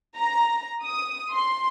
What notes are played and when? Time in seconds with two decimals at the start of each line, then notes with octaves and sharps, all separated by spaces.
0.16 A#5
0.83 D#6
1.32 C6